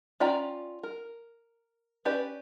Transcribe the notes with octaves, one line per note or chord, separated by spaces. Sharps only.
C#4 F4 D5 G5 A#5
A#4
C#4 G4 B4 D5